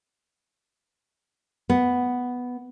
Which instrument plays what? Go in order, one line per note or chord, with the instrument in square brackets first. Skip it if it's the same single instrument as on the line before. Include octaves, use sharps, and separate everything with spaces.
[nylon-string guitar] B3